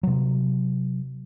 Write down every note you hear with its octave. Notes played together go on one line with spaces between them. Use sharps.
C3 F#3